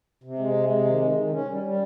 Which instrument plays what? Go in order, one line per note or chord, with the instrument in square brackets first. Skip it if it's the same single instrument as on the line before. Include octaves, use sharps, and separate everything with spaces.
[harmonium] C3
G#3
C3
G#3
D#3
D#3
D#3
C#4
G3
G3